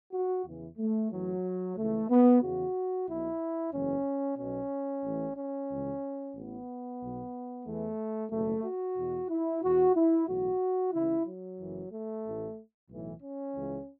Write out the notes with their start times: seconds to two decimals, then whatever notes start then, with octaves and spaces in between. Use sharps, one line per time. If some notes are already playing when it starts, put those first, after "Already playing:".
0.13 F#4
0.45 E2 C#3 E3
0.78 A3
1.11 A1 A2 E3 F#3
1.77 C#2 C#3 E3 A3
2.10 B3
2.42 E2 C#3 E3 F#4
3.08 B1 B2 E4
3.73 F#1 E2 E3 C#4
4.38 B1 B2 C#4
5.04 A1 A2 E3
5.38 C#4
5.70 C#2 C#3 E3
6.35 A1 A2 E3 B3
7.01 B1 B2
7.66 E2 E3 A3
8.31 F#1 E2 B2 A3
8.64 F#4
8.97 E2 B2
9.30 E4
9.62 E2 B2 F#4
9.96 E4
10.28 B1 A2 E3 F#4
10.93 C#2 C#3 E3 E4
11.26 F#3
11.59 F#1 F#2 E3
11.91 A3
12.25 A1 A2 E3
12.90 B1 A2 E3
13.22 C#4
13.55 C#2 C#3 E3